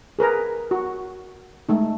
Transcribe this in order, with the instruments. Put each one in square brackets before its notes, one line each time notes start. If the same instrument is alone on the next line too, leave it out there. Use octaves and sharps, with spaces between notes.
[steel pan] G#4 A#4 B4 A#5
F#4
G#3 A3 D#4